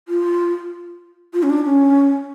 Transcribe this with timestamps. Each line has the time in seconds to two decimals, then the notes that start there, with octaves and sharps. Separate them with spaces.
0.08 F4
1.34 F4
1.43 C#4
1.50 D4
1.65 C#4